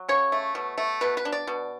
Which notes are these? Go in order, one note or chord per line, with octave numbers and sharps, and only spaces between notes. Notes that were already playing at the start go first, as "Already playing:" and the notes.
Already playing: F#3
C#3 C#5
A3
B2
A3
B2 B4
B4
D4
D5
B2